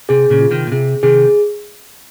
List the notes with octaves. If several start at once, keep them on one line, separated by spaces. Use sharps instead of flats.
C3 G#4
A#2 C#3
F4
C3 D#3
A#2
C3 G#4
C3 D#3 G#4